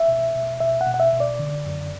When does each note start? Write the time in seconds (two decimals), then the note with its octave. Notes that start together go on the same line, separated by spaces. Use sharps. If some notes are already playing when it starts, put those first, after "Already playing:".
Already playing: E5
0.08 B2
0.34 B2
0.60 B2 E5
0.81 F#5
0.86 B2
0.94 F#5
1.00 E5
1.13 B2
1.20 D5
1.39 D3
1.65 F#2